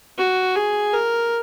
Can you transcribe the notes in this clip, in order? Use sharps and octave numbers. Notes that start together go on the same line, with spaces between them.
F#4
G#4
A#4